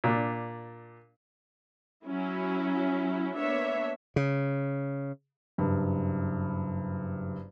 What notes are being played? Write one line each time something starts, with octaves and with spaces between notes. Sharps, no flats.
A#2 D4
F#3 C#4 E4
A#3 B3 D4 C#5 E5
C#3
F#1 G2